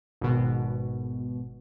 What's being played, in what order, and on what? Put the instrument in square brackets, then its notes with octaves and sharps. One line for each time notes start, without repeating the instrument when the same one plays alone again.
[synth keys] G#1 B2